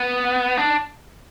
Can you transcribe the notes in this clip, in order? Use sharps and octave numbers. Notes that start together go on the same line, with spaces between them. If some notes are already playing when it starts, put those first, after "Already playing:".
Already playing: B3
D4